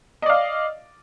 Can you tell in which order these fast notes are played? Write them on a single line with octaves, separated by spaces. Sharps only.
D#5 D5 F5